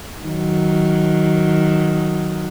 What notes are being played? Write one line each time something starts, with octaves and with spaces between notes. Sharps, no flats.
D#3 F#3